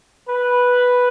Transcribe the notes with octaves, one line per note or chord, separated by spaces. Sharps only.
B4